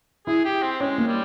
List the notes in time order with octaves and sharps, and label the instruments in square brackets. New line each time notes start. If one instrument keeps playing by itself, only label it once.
[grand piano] E4 [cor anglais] G#4
[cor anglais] G4
C4
[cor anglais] G#3 [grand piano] C#4
[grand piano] A#3
[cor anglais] G3